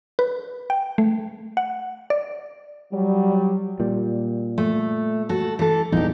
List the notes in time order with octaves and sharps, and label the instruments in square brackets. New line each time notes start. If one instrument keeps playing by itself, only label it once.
[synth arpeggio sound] B4
G5
A3
F#5
D5
[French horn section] F#3 G3
[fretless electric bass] A#2 G3
[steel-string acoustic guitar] A3
F#4 A4
E3 A4
[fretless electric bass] A#1 E2 G2 [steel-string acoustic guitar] D#4 G4